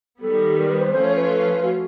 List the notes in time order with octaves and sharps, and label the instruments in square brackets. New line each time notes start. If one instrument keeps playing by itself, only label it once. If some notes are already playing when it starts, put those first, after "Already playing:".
[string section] D#3 G3 B3 [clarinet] A4
[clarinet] A#4
B4
C5
[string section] F3 A3 C#4 F4 [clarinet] C5
[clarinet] C#5
B4
F#4